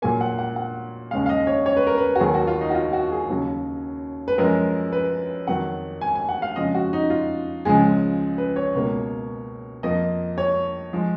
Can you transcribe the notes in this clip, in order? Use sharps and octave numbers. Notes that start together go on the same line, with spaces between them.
A#2 F#3 A#3 G#5
F#5
F#5
F#5
D#2 C#3 G#3 F5
F5
D#5
C#5
C#5
B4
A#4
B4
F#4
D#2 D#3 F#3 A#3 G#4
F#4
F4
D#4
F#4
F4
F#4
G#4
D#2 C#3 F#3
B4
F#2 F3 G#3 A#4
B4
F2 D#3 F#3 F#5
G#5
G#5
F#5
F5
F2 C#3 F3 G#3 D#5
F#4
D#4
F4
C#2 C#3 F3 G#3 G#4
B4
C#5
C#2 B2 A#3
F2 F3 A#3 D#5
C#5
F3 G#3